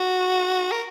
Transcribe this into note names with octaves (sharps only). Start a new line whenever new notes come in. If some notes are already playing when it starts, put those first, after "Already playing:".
Already playing: F#4
A#4